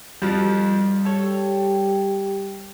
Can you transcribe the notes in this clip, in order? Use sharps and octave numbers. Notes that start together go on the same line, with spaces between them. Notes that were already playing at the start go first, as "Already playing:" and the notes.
F2 F3 G3
G4 A4 C#5